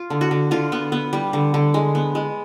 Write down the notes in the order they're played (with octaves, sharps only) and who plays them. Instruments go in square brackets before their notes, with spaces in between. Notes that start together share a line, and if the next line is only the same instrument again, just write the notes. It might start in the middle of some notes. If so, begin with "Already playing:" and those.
Already playing: [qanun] F4
D3
F#4
D3
D3 F4
B3
B3
G3
D3
D3
G#3
B3
G#3